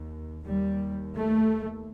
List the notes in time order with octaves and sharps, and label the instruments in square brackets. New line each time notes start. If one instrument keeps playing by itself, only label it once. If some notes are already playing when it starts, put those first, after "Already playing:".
Already playing: [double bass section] D#2
D#2 G3
A3